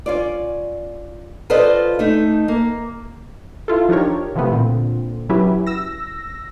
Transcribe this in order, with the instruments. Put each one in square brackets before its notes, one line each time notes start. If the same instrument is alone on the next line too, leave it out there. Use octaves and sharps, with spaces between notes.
[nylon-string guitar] C#4 F4 D5
F4 A4 B4 C5 D5 D#5
A3 D#4
A#3
[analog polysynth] E4 F4 A4
F3 D4 D#4 G4 A#4 C#5
C3 E3 F3 A3 B3 C4
A#2 D3 C4
F#3 C#4 E4 G4 B4
E6 A#6